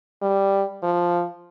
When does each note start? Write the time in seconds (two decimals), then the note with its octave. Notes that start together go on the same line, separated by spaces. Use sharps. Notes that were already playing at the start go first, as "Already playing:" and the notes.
0.22 G3
0.83 F3